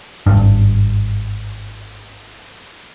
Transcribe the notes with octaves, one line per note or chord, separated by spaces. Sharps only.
G#1 G2